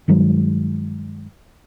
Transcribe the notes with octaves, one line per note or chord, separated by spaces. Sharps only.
G2 D#3 F#3 G#3